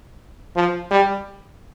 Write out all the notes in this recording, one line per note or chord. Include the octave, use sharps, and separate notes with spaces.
F3
G3